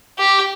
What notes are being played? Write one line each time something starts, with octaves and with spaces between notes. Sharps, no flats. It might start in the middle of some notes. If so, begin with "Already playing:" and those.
G4